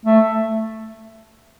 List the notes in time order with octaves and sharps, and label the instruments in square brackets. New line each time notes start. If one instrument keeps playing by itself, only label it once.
[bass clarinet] A3